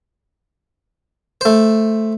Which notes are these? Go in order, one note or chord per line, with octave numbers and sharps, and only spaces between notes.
A3 C5